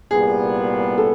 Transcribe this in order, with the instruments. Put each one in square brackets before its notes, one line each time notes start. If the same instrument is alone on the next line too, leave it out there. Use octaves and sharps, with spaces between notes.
[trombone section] C2 A#2 G3 B3 [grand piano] G#4
[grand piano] A4